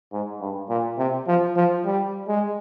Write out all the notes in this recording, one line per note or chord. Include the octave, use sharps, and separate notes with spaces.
G#2
G2
A#2
C3
F3
F3
G3
G#3